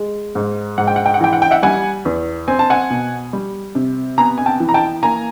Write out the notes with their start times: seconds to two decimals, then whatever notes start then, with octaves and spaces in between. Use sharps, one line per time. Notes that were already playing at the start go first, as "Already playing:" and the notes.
Already playing: G#3
0.35 G#2
0.78 G#2 F#5
0.87 G5
0.96 F#5
1.06 G5
1.14 F#5
1.21 E3 G5
1.33 F#5
1.42 G5
1.51 E5 F#5
1.63 G3 F#5 G#5
2.05 E2
2.48 C4 G#5
2.59 A5
2.70 F#5 G#5
2.90 B2
3.33 G3
3.75 C3
4.18 B3 G#5 A#5
4.38 G#5
4.46 G5 A5
4.60 E3
4.69 A#5
4.74 G5 A5
5.03 A#3 G#5 A#5